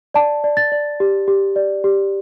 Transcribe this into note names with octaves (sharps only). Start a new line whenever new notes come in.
D5 A5
D5
A6
D5
G4
G4
D5
G4